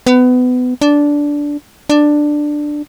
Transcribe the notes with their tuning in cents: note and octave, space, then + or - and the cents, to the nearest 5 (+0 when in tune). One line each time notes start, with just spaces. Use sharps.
B3 +25
D4 -10
D4 +10